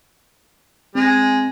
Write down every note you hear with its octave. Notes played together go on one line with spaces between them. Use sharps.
G#3 C4